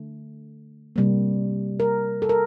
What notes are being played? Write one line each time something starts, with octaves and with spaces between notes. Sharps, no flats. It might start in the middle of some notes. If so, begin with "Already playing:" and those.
Already playing: D3 A3
C3 G3 A#3
A#4
A4
A#4